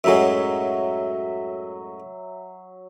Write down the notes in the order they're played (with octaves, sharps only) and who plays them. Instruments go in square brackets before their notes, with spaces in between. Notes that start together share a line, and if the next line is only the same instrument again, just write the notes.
[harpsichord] F#2 A2 G#3 [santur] F#3 E5